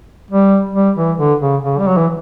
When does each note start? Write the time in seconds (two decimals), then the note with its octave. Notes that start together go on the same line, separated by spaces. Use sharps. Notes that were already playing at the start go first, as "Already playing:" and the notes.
0.31 G3
0.75 G3
0.96 E3
1.18 D3
1.41 C#3
1.63 C#3
1.79 G3
1.88 F#3
1.97 E3